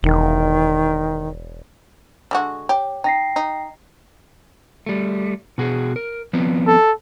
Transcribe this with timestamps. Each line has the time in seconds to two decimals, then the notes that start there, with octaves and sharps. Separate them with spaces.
0.03 E1 D#3
2.31 D3 G#3 F#4
2.69 G4 C#5
3.04 D#4 G5 A#6 C7
3.36 D#4
4.86 G3 A3
5.58 B2 F#4 G#4
5.96 A#4
6.33 F3 B3 C4
6.67 A4